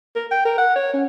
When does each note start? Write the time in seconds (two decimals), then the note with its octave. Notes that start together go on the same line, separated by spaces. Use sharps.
0.15 A#4
0.31 G5
0.45 A#4
0.58 F#5
0.76 C#5
0.93 C#4